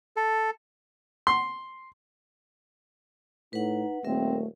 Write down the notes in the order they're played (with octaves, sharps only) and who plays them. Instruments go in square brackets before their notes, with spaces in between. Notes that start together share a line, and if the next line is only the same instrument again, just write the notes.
[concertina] A4
[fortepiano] C6
[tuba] A2 [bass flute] D#4 [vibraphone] B4 F#5
[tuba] D#1 [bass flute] A3 [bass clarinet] C4 [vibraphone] A#4 E5